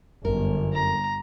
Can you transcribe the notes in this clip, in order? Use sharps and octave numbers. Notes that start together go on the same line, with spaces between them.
G1 F#2 A#4
A#5